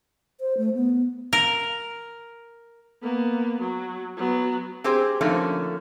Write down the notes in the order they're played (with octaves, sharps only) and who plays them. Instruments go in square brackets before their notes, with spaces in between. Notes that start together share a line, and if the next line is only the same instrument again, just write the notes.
[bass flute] C5
A3
B3
[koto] A#4
[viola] A#3 B3
F#3
F#3 B3
[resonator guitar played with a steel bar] C4 G4 G#4 C5
D3 F3 A3 A#3 C#4 D#4